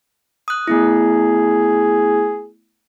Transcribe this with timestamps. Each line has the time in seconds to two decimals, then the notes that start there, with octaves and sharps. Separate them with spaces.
0.48 D#6 F#6
0.67 A3 B3 E4 G#4